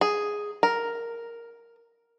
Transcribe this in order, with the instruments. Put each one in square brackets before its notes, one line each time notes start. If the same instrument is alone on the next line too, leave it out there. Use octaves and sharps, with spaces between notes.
[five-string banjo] G#4
A#4